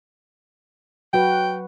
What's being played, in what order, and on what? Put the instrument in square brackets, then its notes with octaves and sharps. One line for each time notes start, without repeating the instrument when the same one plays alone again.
[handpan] F#3 F#4 B4 [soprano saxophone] G5